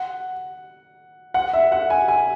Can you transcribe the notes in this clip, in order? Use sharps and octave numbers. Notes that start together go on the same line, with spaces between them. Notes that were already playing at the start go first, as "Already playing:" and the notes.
Already playing: F#5
F#5
E5
F#5
G#5
G#5